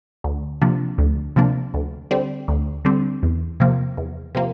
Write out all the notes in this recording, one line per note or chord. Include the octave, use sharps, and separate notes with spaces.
D2
C3 F3 A#3 D4
D2
C3 F3 A#3 D4
D2
D3 G3 C4
D2
D3 G3 C4
E2
C3 F3 A#3
E2
C3 F3 A#3